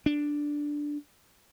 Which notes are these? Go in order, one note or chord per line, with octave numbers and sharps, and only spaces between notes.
D4